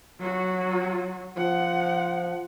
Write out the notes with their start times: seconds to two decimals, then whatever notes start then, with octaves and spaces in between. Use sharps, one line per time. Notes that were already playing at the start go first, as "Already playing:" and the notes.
0.20 F#3 F#4
1.37 F3 F#5